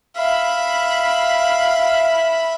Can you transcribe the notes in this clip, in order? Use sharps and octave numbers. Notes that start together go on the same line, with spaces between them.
E5 F5 B5